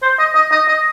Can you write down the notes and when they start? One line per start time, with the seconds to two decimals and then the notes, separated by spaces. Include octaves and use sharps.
0.02 C5
0.19 D#5
0.35 D#5
0.52 D#5
0.68 D#5